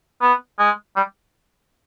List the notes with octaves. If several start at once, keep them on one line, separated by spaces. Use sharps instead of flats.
B3
G#3
G3